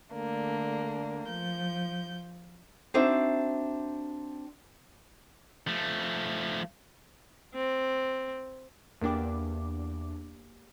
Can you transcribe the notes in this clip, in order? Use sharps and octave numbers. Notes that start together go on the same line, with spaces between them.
D3 A3 A#3 D4
F3 G6
C4 D4 D#4 F#4 C5 E5
F3 A3
C4
E2 A#3 D4 G4 D6